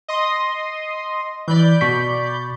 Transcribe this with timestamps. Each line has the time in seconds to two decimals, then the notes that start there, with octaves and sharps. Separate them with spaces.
0.08 D#5 C6 D#6
1.48 E3 D5 B5 G6
1.81 B2 C#6 B6